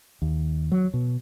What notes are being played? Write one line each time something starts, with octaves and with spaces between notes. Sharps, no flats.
D#2
F#3
B2